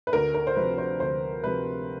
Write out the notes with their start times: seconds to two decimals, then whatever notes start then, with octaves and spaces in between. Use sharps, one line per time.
0.07 B4
0.13 D2 A#4
0.34 A#4
0.47 C5
0.57 C3 F3 B4
0.78 C5
1.00 D2 C5
1.44 C3 F3 B4